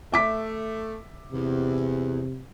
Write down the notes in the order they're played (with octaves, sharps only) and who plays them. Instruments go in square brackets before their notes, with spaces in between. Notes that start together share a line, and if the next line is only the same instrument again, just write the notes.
[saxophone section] A3 [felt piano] E5 D6 B6
[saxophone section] E2 [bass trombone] C3